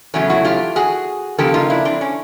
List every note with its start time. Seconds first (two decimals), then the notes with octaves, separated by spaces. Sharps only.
0.14 E2 C#3 F#3 A3 C#4
0.30 E4 F#4
0.45 F4 G4
0.76 F#4 G#4
1.38 C#3 F3 A#3 G4 A4
1.54 D#4 F4
1.70 D4 E4
1.85 C4 D4
2.01 C#4